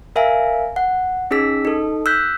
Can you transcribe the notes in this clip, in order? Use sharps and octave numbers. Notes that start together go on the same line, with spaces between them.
A#4 E5 F5 G#5
F#5
C#4 D#4 G#4 E6 B6
D#4 A4
E6 F#6 G6 B6